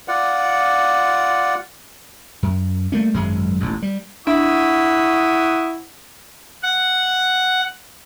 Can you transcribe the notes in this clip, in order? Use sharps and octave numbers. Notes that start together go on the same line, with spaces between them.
F4 D5 F#5
F#2
G3 A3 A#3 C#4
G#1 F#2 F#3 G#3
E1 A1 D#2
G3
D4 E4 E5 F#5 C#6 D#6
F#5